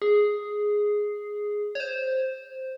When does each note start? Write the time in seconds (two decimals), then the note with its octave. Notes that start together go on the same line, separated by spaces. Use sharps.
0.02 G#4
1.75 C#5
1.80 C5